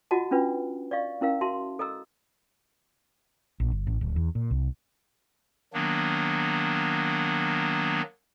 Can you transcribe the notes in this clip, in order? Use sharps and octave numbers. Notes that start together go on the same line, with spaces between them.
F4 F#4 D#5 F#5 A5
C#4 D4 F4 B4
D5 D#5 F5 C#6
C#4 E4 A#4 F5
F#4 E5 A5 C6
A4 D#5 A#5 E6
A#1
G1
A1
D1
E2
A#2
C2
D#3 F#3 A#3 B3 D4